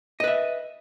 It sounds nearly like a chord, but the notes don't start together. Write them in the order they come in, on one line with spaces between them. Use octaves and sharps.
D#5 B4 E5